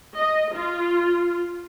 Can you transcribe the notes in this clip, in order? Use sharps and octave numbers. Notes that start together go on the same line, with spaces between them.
D#5
F4